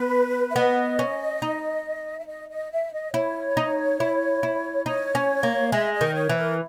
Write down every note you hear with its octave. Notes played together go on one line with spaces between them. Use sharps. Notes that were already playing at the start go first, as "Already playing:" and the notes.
Already playing: B3 B4
E5
B3 D#5
C#4
D#4
E5
D#5
D#5
E5
D#5
E4 C#5
D#4
E4
E4
D#4 C#5
C#4
A#3
G#3 E5
D#5
D#3
C#5
E3
A#4